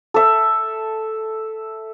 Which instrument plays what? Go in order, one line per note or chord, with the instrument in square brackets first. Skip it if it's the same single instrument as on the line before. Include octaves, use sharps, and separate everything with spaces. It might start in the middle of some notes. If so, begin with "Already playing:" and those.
[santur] A4 E5